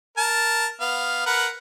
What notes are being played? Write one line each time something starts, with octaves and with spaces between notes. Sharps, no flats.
A#4 A5
B3 F5
A#4 B4 F#5